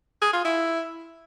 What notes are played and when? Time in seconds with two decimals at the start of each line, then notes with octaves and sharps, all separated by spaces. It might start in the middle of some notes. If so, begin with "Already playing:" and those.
0.22 G#4
0.33 F4
0.45 E4